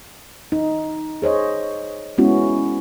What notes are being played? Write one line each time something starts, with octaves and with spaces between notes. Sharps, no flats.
D#4
G#4 C5 C#5 D#5
G#3 B3 C#4 E4 F#4